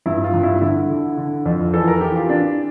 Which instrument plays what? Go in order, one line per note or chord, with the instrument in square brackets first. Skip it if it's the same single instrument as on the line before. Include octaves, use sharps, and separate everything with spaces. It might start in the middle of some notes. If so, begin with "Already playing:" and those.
[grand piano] G2 E4
F4
G2
E4
D3 E4
D3
D3
F2
E3 A4
A#4
E3 G4
F4
E3 D4